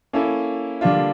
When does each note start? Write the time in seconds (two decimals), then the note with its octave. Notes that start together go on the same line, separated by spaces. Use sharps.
0.13 A#3 C#4 E4 A4
0.81 D3 G3 A#3 D4 F4